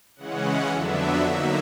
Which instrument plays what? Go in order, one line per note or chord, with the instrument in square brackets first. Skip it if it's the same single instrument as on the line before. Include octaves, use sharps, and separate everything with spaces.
[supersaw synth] C#3 E3 G#3 C#4 F#5
F2 D3 F#3 B3 D4 E5
D3 F#3 A#3 D#4 E5